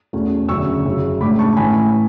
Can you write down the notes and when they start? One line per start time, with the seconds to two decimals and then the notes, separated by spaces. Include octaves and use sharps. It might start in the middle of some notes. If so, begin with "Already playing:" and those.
0.13 E2 B2 A3 C#4
0.49 F#1 F#2 D3 C#6 E6
0.85 F#1 F#2 C#3 F#3
1.21 A1 A2 G#3 D4 B5 D6
1.39 A5 C#6
1.57 A1 A2 E3 G#5 B5